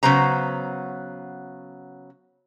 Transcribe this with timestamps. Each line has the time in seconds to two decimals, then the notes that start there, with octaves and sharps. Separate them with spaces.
0.03 C#3 F#3 B3 C5 A#5